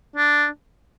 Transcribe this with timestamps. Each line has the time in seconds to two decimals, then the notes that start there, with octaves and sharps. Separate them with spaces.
0.16 D4